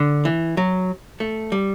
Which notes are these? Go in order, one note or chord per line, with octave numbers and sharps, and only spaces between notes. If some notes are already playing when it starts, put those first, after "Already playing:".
Already playing: D3
E3
F#3
A3
G3